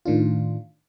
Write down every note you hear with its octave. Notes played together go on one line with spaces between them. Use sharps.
A2 D#3 D4 F4